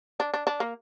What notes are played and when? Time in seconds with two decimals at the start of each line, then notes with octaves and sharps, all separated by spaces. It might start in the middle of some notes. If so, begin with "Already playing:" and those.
0.20 D4
0.34 D4
0.47 D4
0.60 A#3